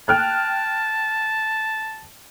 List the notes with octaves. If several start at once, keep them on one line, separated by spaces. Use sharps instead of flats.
G5 A5 F6 F#6